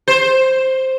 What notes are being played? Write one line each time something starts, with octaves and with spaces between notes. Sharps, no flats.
C5